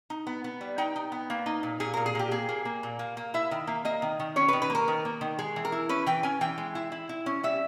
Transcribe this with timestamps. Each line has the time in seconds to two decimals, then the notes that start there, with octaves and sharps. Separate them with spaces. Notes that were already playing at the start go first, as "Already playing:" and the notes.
0.10 D#4
0.27 B3
0.44 B3
0.61 G3
0.78 D#4 G5
0.96 D#4
1.12 B3
1.30 A#3
1.46 D#4
1.63 A#2
1.80 A#2 G#4
1.94 A#2 A#4
2.06 G#4
2.15 A#2 G4
2.31 A#3 G#4
2.49 A#3
2.65 A#3
2.83 A#2
2.99 A#3
3.17 A#3
3.34 E4 E5
3.51 D#3
3.67 A#3
3.85 A#3 D#5
4.02 D#3
4.20 D#3
4.36 C#4 C#5
4.48 B4
4.53 D#3
4.62 B4
4.70 A#3 A#4
4.88 D#3
5.05 A#3
5.21 D#3
5.39 G#3 G#4
5.56 E3
5.65 A#4
5.72 E4
5.89 C#4 B4
6.06 E3 G5
6.23 C#4 G#5
6.41 E3 G5
6.58 G#3
6.75 E4
6.92 E4
7.09 E4
7.26 C#4
7.43 G3 E5